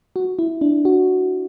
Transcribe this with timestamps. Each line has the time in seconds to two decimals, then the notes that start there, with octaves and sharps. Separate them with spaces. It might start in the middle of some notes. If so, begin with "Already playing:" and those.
0.16 F#4
0.39 E4
0.61 D4
0.85 F#4